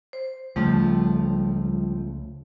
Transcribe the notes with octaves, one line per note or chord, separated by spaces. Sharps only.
C5
C#2 C#3 F3 G3 A3